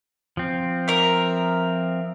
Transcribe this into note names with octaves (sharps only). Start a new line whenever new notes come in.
F3 C4
A#4 E5